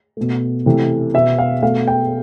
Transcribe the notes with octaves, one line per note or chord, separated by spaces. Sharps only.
B2 A3
C3 E3 A3
B2 B3 E5
F5
B2 A3 F5
G5